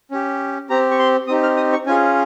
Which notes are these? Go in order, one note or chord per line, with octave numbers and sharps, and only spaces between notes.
C#4 G4
C4 G4 A#5
C#6
C6
C4 D#4 G4 D#6
F6
D#6
C#6
C#4 F4 G#4 G#5